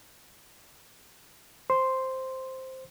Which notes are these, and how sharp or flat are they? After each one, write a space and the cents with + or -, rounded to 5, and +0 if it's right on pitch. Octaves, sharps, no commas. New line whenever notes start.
C5 +0 C6 +0